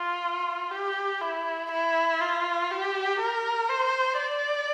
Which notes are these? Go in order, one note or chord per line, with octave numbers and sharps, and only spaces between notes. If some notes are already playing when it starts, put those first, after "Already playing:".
Already playing: F4
G4
E4
E4
F4
G4
A#4
C5
D5